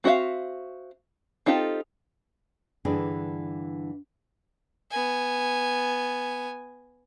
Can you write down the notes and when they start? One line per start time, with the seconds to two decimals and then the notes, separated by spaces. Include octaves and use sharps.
0.04 C4 F#4 A#4 E5 F5
1.46 C4 D#4 F4 G4 A4
2.85 G2 D3 E3 D4 G#4
4.91 B3 G#5